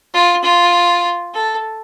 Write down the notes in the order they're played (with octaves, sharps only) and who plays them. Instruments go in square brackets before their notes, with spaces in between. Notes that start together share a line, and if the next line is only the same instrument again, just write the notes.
[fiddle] F4
F4
A4